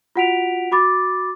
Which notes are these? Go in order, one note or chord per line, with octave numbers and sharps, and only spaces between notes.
F4 F#4 F#5 B6 D7 F7
F#4 B5 D6 A6